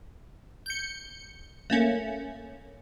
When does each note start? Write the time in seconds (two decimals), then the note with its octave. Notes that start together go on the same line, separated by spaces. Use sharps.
0.66 G6 C#7
1.70 A3 A#3 C#4